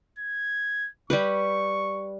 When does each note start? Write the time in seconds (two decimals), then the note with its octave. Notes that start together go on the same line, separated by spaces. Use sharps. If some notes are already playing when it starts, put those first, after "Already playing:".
0.19 G#6
1.10 G3 G4 B4 C#6